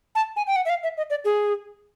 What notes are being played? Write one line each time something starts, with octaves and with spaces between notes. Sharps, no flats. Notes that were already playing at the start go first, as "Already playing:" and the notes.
A5
G#5
G5
F#5
E5
F5
E5
D#5
D5
G#4